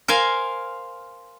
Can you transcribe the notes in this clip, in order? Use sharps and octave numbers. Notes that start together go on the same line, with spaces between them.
A#4 C5 F5 G#5